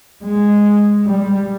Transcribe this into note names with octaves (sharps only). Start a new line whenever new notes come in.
G#3
G3